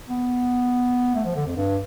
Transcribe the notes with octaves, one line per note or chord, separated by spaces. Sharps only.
B3
A3
F3
D3
F2
G2